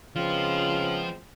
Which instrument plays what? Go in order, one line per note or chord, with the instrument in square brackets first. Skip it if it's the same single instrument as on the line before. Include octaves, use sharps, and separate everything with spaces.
[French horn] C#3 [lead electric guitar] F3 [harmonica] G#3 B3 C4 [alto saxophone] F4